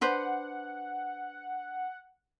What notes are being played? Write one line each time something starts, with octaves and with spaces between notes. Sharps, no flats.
D4 B4 C5 F#5